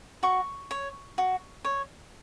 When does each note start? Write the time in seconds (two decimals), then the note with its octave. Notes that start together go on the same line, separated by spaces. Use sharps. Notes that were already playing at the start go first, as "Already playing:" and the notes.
0.23 F#4 C#6
0.71 C#5
1.18 F#4
1.65 C#5